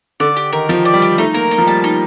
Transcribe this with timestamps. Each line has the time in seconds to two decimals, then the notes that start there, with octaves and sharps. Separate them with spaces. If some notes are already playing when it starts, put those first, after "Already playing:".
0.20 D3 D5
0.36 G4
0.52 D#3 A#4
0.69 F3 G4
0.85 D5
0.94 G3
1.02 G4
1.18 A3 D#4
1.34 A#3 A#4
1.51 D#4
1.58 F3
1.67 G3 A5
1.84 D#4